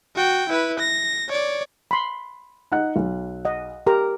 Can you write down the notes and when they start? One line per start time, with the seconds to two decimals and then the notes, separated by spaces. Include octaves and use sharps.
0.15 F#4 G5
0.49 E4 B4
0.79 A#6
1.29 C#5 D5
1.91 B5 C6
2.72 D#4 F#5 F#6
2.96 B1
3.45 D#5 F#5
3.87 G4 A#4 A#5